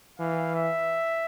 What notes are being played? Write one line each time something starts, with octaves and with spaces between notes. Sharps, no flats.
E3 F5
E5